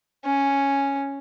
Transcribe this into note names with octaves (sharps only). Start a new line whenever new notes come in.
C#4